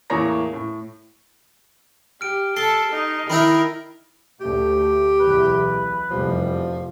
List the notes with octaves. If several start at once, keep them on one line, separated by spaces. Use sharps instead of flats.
E2 A2 A#3 C#5 A#5 A#6
A2
G4 F6 D7
A4 A5 C7 G7
D#4
D#3 D#4 E4 A#4 B5 E6
D2 A3 G4
B1 E2 B4
F1 E2 F3 G3